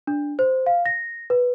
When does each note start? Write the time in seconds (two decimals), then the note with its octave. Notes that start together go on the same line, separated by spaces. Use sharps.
0.07 D4
0.39 C5
0.66 F5
0.86 A#6
1.30 B4